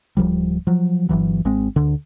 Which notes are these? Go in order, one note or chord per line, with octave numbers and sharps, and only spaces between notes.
D1 C2 F3 G3
F3 F#3
G1 C2 E3 F#3
G#1 G#3 C4
D2 D3